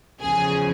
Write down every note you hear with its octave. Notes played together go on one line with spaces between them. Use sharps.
E2 C#3 F3 G#4